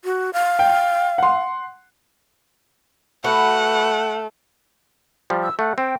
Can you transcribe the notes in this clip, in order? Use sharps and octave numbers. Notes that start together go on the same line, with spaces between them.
F#4
F5
G5
F#5 C6
A3 F#4 B4 F#5
F3 G3
E6
A3 F#5
C4 G5